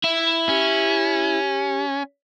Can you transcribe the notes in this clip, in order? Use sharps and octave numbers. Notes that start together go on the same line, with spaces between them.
E4 E5
C#4 G4